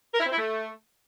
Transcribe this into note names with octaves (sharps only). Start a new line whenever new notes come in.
A#4
E4
C4
E4
A3